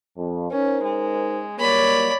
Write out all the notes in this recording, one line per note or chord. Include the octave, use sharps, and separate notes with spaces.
F2
C#4 D#4 A#4 C5
G#3
F#3 G3 A#3 C#5 D5 B5